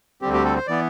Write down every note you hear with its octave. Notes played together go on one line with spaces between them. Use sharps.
D2 D3 G3 C4 G4
G4
A4
C5
E3 B3 D5